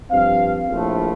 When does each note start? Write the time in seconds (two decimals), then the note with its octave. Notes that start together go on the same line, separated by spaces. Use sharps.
0.11 G2 F3 C4 F5
0.69 A#1 A2 F3 A3